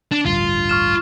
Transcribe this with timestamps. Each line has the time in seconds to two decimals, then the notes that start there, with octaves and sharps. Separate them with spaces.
0.11 D4
0.25 A1 D2 G2 F4
0.69 C#6 F6 E7